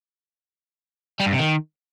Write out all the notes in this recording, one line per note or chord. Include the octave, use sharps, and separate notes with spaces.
G3
G2
C3
D#3